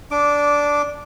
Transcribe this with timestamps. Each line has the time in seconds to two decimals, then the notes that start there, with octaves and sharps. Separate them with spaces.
0.11 D4 D6